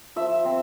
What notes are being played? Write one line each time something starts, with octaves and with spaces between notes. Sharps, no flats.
F3 E5
C4